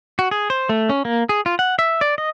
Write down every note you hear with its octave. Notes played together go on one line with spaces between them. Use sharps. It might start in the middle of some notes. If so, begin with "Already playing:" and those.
F#4
G#4
C5
A3
C#4
A#3
G#4
F4
F#5
E5
D5
D#5